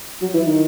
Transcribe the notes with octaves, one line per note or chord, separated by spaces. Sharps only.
F#3
E3
D#3